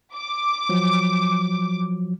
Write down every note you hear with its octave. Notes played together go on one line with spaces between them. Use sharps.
D6
F3 F#3